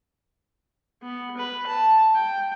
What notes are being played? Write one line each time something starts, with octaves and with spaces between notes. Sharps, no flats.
B3
B4
A5
G5